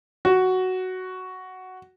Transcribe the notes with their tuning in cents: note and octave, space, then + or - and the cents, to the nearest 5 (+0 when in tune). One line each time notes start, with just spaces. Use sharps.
F#4 +5